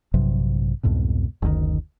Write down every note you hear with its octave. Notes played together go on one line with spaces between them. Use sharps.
A#1 G2 C3 F#3
C2 F2 G#2 B2
F#1 D2 C3 D#3